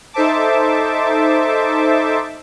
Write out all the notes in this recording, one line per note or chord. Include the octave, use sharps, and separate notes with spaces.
D#4 A4 C5 E5 A5 D6